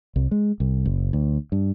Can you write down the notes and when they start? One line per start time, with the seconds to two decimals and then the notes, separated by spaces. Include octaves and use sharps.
0.16 C2
0.31 G#3
0.60 C2
0.86 F#1
1.13 D2
1.52 G2